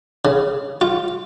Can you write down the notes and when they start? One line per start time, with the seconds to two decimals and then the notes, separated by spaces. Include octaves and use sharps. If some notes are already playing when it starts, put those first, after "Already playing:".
0.25 C#3
0.81 F4